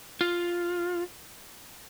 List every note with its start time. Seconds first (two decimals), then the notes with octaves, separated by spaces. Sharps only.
0.21 F4